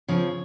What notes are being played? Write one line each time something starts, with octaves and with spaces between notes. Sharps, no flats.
C#3 F3 C4 C#5